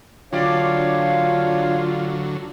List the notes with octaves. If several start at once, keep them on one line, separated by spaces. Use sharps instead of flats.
D3 F#3 D4 F4 G4 C#5 D5 F5